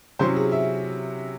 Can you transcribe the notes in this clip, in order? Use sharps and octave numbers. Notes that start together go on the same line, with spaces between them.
C3 F#3 C#4 E4 C5
G#4
E5